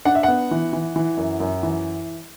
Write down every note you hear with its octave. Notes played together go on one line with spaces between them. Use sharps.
D4 F#5
E5
B3 F#5
E3
E3
E3
F#2
F#2
E3